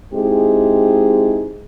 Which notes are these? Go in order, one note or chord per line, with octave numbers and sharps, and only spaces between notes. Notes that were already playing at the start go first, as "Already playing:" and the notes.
G#3 C4 D#4 E4 G4 G#4